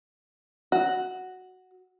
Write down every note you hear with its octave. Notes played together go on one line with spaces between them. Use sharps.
F#4